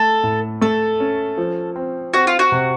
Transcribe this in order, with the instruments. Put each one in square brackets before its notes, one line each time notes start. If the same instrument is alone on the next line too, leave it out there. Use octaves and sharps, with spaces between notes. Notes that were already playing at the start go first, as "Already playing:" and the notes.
Already playing: [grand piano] A3 [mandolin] A4
[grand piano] A2
[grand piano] A3 [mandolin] A4
[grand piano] C#4
F3
C4
[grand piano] C4 [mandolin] F#4
[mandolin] F4
F#4
[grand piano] C3